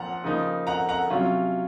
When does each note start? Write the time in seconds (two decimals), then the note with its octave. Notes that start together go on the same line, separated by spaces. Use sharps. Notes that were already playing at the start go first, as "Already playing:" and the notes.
Already playing: A#2 F3 F#5 A#5
0.24 C#3 F3 A#3 D#4
0.67 F#5 A#5
0.89 F#5 A#5
1.10 C3 F#3 C#4 F4